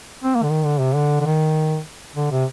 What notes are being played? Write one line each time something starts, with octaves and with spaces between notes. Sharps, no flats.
C4
A#3
D3
D#3
D3
C3
D3
D3
D#3
D3
C3